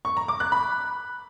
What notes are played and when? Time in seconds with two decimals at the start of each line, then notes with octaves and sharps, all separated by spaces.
0.05 C#6
0.17 A#5
0.28 D6
0.40 F#6
0.52 B5